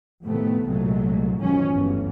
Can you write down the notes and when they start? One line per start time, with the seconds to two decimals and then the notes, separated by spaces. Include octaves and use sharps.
0.25 F2 A2 C3 D#3 A3 B3
0.67 C2 A#2 F#3 G#3 A3
1.38 A1 F#2 B2 D#3 F3 C#4
1.70 G1 D2 G2 E3 F#3 B3